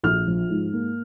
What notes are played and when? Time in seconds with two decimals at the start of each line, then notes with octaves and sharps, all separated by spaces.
0.03 A#1 F6
0.27 F3
0.49 G#2
0.73 A#3